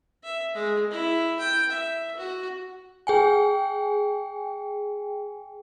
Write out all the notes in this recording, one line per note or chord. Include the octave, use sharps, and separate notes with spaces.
E5
G#3
E4
G5
E5
F#4
G#4 G5 G#5